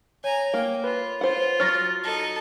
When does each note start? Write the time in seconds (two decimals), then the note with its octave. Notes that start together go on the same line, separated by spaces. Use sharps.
0.24 C#5 G#5 A#5
0.54 A#3 G5
0.84 F4 B4
1.21 F4 C5 F#5
1.60 F#3 C#5 F6 A6 A#6
2.03 D#4 A4